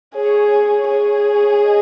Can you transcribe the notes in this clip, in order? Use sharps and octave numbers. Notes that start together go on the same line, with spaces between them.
G#4 C#5
G#4
D#5